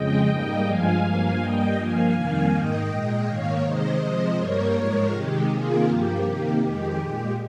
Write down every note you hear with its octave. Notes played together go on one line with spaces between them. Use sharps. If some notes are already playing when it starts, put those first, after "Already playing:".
Already playing: F2 C#3 G#3 D#5 G5
G#2 G3 A#3
G2 F3 G#3 F5 G#5
G2 F3 A#3
G2 G3 A#3 D#5 G5
G2 F3 A#3 F5 G#5
F2 C3 D#3 G3 A#3
G#2 D#3 A#3 D#5 G5
A#2 G#3
G#2 D#3 A#3 C#5 F5
C3 D#3 G#3 C5 D#5
C3 F3 G#3
G2 G3 A#3 A#4 C#5
G#2 F3 G#3
C3 D#3 G#3 G4
C3 D#3 A#3 F4 G#4
G2 F3 A#3 G4
C3 D#3 A#3
F2 D#3 G#3 G4
A#2 G#3